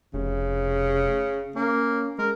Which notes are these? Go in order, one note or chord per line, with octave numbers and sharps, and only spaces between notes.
F1 C#3
A#3 C#4
G#3 A#4